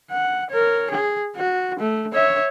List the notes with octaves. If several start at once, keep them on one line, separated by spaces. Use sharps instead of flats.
F#5
A#4 C#5
G#4
F#4
A3
C#5 E5